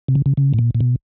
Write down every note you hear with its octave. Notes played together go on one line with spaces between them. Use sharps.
C3
C#3
C#3
C#3
A2
A#2
A#2
B2